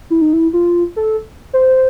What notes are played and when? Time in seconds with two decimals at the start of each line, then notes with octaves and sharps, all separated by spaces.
0.10 E4
0.22 D#4
0.33 E4
0.53 F4
0.96 A4
1.53 C5